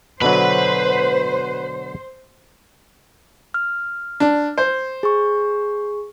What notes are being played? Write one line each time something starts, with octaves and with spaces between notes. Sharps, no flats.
B2 D3 F#3 B4 C5 B5
F6
D4
C5
G#4 C#6